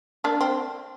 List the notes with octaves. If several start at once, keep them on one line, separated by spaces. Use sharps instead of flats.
A#3 D4
C4